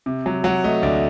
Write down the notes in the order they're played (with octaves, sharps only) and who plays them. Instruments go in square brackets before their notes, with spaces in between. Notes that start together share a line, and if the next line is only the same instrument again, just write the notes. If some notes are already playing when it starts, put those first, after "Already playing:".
[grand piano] C3
F#3
F#3 F#5
A3 D#5
D2 D5